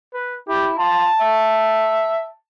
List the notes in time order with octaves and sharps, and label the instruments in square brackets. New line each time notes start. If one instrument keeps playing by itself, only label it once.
[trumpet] B4
[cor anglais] E4 [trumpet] G4
[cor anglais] F4 [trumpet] A5
[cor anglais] E5